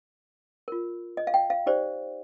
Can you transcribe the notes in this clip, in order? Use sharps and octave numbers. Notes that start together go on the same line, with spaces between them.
F4 A#4
D#5
F5
G5
F5
D#4 G4 C5 D5